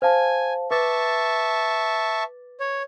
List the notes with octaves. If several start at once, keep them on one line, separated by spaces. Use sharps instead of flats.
C5 F5 G#5 A5
B4 E5 A5 C#6 D6 A6
C#5